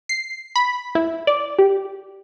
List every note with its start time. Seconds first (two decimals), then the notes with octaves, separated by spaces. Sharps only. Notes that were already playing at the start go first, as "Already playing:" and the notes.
0.09 C7
0.56 B5
0.95 E4
1.27 D5
1.59 G4